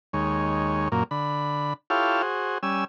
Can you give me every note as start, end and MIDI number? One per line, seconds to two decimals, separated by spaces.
0.13 0.89 39
0.13 0.89 56
0.13 0.89 73
0.92 1.03 42
0.92 1.03 46
0.92 1.03 58
1.11 1.73 50
1.11 1.73 83
1.90 2.22 64
1.90 2.22 65
1.90 2.22 67
1.90 2.22 69
1.90 2.22 73
1.90 2.22 77
2.22 2.58 66
2.22 2.58 68
2.22 2.58 72
2.63 2.85 55
2.63 2.85 61
2.63 2.85 80
2.63 2.85 88